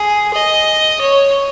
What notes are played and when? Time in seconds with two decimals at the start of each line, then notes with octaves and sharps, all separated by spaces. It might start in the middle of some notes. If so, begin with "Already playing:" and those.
Already playing: G#4
0.34 D#5
1.01 C#5